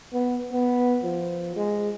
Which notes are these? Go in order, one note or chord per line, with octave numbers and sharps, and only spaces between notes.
B3
B3
F3
G#3